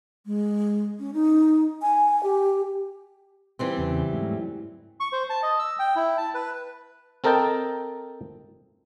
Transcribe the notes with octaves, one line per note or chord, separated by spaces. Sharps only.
G#3
C#4
D#4
G#5
G4
E3 G3 C4
E2 C#3
G#2 F#3 A3
C#6
C5
A5
D#5
E6
G5
E4
A5
B4
C4 A4 A#4 D#5 G5 A5